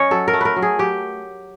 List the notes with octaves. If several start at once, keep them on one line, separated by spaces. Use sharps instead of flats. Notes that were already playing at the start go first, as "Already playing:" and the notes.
Already playing: C#4 C#5 D#5
F#3 A4
A#4
A3
A#4 B4
F#3
G#4
F#3 G4